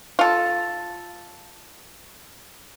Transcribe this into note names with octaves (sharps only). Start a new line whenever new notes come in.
F4 A4